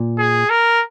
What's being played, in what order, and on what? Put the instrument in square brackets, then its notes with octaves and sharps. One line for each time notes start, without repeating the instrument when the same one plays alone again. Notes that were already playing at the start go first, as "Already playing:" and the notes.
Already playing: [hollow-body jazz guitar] A#2
[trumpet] G#4
A#4